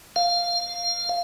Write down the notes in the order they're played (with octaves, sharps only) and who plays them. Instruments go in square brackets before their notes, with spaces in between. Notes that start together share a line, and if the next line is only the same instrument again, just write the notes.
[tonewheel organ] F5